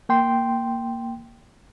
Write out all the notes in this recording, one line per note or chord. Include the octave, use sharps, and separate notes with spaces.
A#3 G5 C6